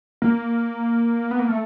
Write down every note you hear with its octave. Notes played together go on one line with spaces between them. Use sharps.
A#3
B3
A#3
A3